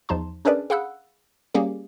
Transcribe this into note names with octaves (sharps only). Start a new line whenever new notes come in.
E2 F3 D#4 A5 C6
C#4 D4 G#4 A#4 B4 D5
G#4 F5 F#5 B5 E6 F#6
G3 A#3 C#4 G4 G#4